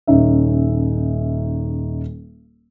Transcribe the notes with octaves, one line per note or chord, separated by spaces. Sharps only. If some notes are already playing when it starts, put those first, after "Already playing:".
D#1 C#4 D#4 E5